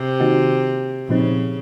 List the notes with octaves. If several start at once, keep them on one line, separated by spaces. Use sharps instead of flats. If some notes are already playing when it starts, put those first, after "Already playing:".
Already playing: C3
D#3 A#3 D#4 F#4
A#2 C#3 F3 C4 D#4